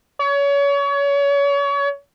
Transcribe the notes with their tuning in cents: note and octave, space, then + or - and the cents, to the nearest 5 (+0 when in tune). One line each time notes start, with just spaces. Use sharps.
C#5 +30